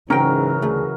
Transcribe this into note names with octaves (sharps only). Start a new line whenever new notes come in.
G#2 C#3 E3 F#3 C#4 A#4 G5
D2 A3 G#4